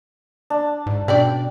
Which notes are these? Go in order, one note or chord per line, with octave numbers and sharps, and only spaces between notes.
D4
G#2
B2 C#4 D4 D5 G5